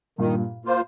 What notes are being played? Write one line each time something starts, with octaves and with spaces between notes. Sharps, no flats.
G2 A#2 D#3
A#3 F4 C5